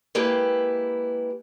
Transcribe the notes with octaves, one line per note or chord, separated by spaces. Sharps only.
G#3 A#3 E4 G4 B4